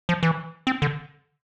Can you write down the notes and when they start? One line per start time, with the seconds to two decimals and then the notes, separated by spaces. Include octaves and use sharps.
0.09 F3
0.23 E3
0.67 C4
0.82 D3